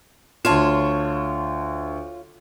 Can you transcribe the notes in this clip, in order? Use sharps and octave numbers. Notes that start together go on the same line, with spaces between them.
D2 F4 C#5 A5 E7